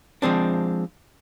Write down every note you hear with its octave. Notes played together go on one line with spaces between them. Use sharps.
F3 G#3 C4 D4